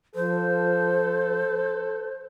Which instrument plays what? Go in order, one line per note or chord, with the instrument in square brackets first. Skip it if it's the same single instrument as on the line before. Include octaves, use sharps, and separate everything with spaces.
[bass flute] F3 [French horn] A4 [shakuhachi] C5